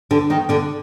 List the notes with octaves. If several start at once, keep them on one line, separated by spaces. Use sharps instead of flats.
D3 D4
D#3 D#4
D3 D4